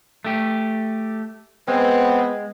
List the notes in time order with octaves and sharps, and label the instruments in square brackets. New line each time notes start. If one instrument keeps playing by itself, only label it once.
[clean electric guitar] A3 G4
[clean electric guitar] G#3 [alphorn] B3 [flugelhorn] C4